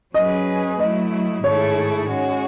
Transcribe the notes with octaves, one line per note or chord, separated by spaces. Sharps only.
F#3 C#4 G#4 B4 D#5
F#3 A3 E4 D#5
G#2 D#3 A3 E4 G#4 C#5
G#3 C#4 F#4